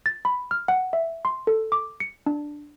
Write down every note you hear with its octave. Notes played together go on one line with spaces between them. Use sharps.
A6
B5
F6
F#5
E5
C6
A4
D6
C#7
D4